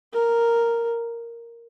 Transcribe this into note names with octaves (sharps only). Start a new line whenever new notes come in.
A#4